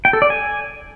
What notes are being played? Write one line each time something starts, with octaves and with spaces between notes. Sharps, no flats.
G5
A4
D5
G#5